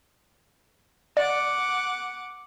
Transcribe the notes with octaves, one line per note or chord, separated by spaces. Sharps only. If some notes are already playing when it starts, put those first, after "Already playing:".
D5 F#5 D6